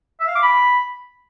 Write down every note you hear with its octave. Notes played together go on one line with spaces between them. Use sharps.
E5
F5
D6
B5